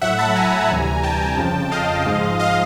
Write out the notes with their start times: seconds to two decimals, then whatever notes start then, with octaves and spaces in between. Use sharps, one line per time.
0.02 A2 F#3 E5 F#5
0.19 A5 B5
0.35 G#5 A#5
0.70 D2 C3 E3 G3
1.03 G5 A5
1.37 F2 C#3 F3
1.72 D#5 F5
2.05 G#2 F3 G#3
2.39 D#5 F5